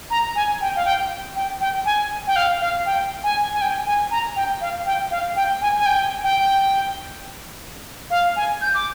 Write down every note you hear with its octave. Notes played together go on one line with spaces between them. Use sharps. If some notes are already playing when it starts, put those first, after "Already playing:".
A#5
G#5
G5
F5
G5
G5
G5
G#5
G5
F5
F5
G5
G#5
G#5
G5
G#5
A#5
G5
F5
G5
F5
G5
G#5
G#5
G5
G5
F5
G#5
G6
D6